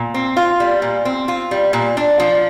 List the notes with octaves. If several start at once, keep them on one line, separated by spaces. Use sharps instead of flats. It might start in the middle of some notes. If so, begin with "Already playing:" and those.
Already playing: A#2
C4
F4
G3
A#2
C4
F4
G3
A#2
D4
F3